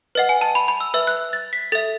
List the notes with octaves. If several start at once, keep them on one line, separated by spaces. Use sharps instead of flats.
B4 D#5 F#5
G#5
A5
B5
B5
E6
B4 E5 E6
F#6
A6
B6
A4 E5 A6